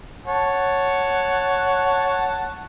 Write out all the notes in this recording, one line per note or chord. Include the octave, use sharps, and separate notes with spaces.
C#5 F#5 A5